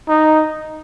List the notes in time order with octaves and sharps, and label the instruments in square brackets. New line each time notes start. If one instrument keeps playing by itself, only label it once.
[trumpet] D#4